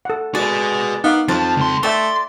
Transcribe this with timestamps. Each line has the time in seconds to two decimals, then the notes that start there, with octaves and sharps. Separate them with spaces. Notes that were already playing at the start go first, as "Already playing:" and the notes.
0.05 A4 F#5
0.35 G#3 F#4 B4 D5
1.04 B3 D#4 F5 D6
1.28 F2 F3 F4 A5
1.57 C#2 C6
1.83 A3 D5 E5 G5 C6 C#6